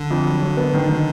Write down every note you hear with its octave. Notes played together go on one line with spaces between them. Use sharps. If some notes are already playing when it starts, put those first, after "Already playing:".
Already playing: D3
F2
F#3
F#3
B3
D#3
D#3